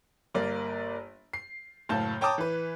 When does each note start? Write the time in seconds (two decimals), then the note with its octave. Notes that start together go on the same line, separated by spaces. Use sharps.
0.34 G1 A#3 D5
1.33 C7
1.89 F#1 A2 F5 A5 G6
2.21 C#5 G5 A5 A#5 D6 D#6
2.38 E3 B4